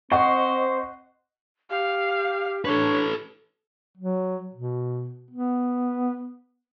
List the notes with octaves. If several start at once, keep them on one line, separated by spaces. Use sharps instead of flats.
C4 C5 D#5 F#5 C#6
G4 F5
D4 A4 B4 C#5
F#3
B2
B3